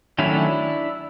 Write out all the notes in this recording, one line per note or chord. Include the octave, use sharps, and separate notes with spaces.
D#3 F#3 A3 C#4 D4 E4